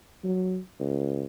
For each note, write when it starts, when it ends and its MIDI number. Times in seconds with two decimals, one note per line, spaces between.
0.24 0.59 54
0.80 1.25 37